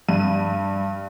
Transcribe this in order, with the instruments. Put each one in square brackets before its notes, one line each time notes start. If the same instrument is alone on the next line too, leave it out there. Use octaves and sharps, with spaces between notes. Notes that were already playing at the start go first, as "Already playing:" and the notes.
[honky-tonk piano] G2 D#7